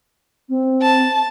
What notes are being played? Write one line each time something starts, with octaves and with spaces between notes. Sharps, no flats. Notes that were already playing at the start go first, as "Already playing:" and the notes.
C4
A5